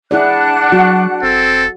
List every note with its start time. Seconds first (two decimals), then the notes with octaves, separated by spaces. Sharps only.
0.11 D4 E4 G#4 D5 F#5 F#6
0.72 F#3 F#4
1.23 E1 C4 A4